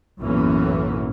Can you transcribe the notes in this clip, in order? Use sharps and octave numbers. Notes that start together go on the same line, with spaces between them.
B1 F#2 A2 E3 A#3 C#4